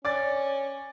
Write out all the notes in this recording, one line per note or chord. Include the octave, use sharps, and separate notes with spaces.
C#4 D5 A6